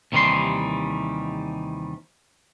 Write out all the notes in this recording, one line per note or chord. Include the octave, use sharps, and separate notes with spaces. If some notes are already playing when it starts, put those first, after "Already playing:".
D#2 C3 D#3 E3 G3 C6